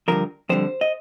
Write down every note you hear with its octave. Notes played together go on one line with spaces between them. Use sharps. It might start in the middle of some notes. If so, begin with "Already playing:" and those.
G2 D3 F3 A#4
F2 D3 G3 C5
D#5